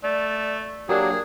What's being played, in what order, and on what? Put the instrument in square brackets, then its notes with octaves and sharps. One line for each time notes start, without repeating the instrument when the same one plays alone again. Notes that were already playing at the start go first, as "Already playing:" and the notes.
[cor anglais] A3 [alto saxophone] D5
[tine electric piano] F#3 A#3 D4 [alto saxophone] G4 [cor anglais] G#4